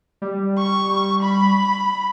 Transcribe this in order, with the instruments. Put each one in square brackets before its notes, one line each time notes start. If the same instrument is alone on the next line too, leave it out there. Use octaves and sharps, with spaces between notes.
[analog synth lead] G3
[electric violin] C#6
B5